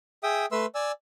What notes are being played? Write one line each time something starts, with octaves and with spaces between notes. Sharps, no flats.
G#4 E5 G5 D#6
A3 B4 E5 C6 E6
D5 G#5 E6